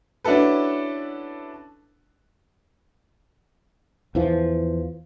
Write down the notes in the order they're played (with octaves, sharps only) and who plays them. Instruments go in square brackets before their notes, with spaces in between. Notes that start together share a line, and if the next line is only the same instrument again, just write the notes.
[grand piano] C#4 D4 E4 F#4 A4 B4
[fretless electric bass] E2 E3 F3